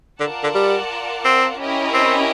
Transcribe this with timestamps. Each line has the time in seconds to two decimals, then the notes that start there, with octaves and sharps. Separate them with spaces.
0.20 D3 F4 A#4 D5 F#5 A5
0.44 D3
0.55 G3
1.25 C4
1.59 C#4 E4 G4 A#4 D#5
1.94 C4